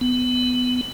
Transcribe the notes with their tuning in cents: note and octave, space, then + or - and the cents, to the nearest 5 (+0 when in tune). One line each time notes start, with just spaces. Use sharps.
B3 +20